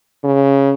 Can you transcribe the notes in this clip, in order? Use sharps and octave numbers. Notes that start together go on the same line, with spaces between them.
C#3